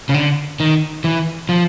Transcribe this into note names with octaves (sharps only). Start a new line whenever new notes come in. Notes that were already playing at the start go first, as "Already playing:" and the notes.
C#3
D3
D#3
E3
F3